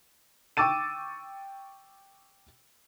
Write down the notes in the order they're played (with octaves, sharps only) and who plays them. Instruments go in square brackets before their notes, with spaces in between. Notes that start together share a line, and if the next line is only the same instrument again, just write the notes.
[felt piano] G5 C#6 D6 E6 A6 D#7